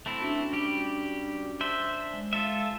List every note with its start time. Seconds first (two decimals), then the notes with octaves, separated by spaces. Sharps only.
0.06 A3 C4 E4
0.21 C#4 D4 F#4
0.53 G3 G4
1.61 D4 C5 E5
2.13 G#3
2.33 F4 A4 E5